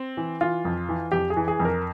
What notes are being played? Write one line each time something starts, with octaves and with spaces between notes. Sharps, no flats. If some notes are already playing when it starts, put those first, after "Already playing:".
Already playing: C4
E3
E3 F4
F2
E3
F2 G4
G#4
E3
G#4
F2
A#4